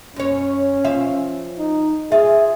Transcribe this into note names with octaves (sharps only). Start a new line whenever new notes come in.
F#2 C#4 C#5
F3 E5 F5
D#4
F4 G#4 E5